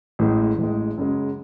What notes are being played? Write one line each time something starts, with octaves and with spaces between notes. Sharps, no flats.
A1 A2 G#3
A1 A2 G#3
F#2 C#3 G#3